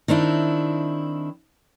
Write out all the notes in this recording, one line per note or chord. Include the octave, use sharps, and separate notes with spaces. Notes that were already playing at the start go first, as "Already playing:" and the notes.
D#3 C4 D4 E4